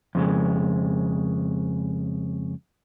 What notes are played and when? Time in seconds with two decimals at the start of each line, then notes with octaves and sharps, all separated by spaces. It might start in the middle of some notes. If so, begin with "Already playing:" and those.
0.15 F2 C#3 G#3